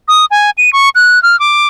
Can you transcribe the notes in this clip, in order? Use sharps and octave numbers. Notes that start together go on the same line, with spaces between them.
D#6
G#5
D#7
C#6
F#6
F6
D6